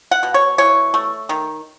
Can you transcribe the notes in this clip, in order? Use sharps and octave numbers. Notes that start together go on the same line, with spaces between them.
F#5
B2
C#5
E3 C#5
A3
D#3